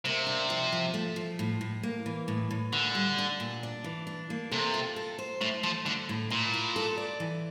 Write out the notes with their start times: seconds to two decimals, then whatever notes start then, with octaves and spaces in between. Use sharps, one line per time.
0.05 C3 A#3
0.27 D4
0.50 F3
0.72 F3
0.94 A3
1.16 F3
1.39 A2
1.61 A2
1.83 A#3
2.06 E3
2.28 A2
2.51 A2
2.73 A#2 D3
2.95 G3
3.18 D4
3.40 A#2
3.63 D4
3.84 E3
4.07 D4
4.30 A#3
4.51 C3 A4
4.74 F4
4.96 A4
5.19 C5
5.41 A2 A3
5.63 F3 A3
5.86 D3 A3
6.09 A2
6.30 A#2 E4
6.54 E4
6.76 A4
6.97 D5
7.20 E3